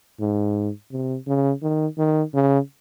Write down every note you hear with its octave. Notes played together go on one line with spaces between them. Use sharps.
G#2
C3
C#3
D#3
D#3
C#3